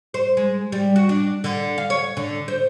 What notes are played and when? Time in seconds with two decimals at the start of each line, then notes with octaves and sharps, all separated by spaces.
0.14 C5
0.37 G#3
0.72 G3
0.96 F#4
1.09 D4
1.44 D3
1.78 F5
1.90 C#5
2.17 D3
2.48 C5